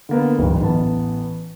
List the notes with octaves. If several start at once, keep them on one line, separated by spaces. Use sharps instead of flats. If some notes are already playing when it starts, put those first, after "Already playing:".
D3 A#3 B3
D1 A1
A1 B3 A5